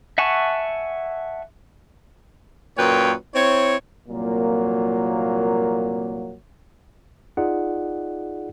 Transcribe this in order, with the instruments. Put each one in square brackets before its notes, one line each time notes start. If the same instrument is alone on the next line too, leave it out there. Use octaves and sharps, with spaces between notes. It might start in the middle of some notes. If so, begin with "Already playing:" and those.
[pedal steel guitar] E5 F#5 G#5 A5 C#6
[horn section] F#2 A#2 B4 C#5 G5
C4 E4 C#5
[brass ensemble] C2 F2 A#2 F#3 A#3
[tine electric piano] D#4 F4 G#4 D5 F#5